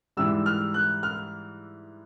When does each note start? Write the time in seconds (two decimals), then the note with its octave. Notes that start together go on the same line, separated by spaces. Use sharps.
0.17 G#2 E3 G3 E6
0.46 F6
0.74 F#6
1.03 F6